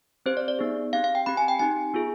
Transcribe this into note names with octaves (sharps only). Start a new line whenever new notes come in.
C4 G4 C5
D5
D5
B3 D#4 G#4
C4 G4 F5
F5
G5
C4 G4 B5
G#5
G5
C4 D#4 G4 G#5
B3 F4 G#4